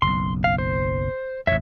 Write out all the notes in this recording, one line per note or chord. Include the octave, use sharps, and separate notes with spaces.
F#1 B1 C6
F5
C5
A1 F2 C#5 E5